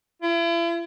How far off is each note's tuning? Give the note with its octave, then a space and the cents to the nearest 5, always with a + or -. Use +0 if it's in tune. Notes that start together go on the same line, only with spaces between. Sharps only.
E4 +40